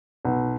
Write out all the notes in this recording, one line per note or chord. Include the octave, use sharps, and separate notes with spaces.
B1